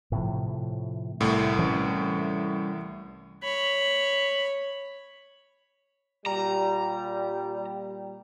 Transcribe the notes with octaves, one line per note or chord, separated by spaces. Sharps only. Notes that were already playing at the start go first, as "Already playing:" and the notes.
A2 C3 F3
C2 A2
E3 G3 C#4
C#5 B5
A#2 G3 A#5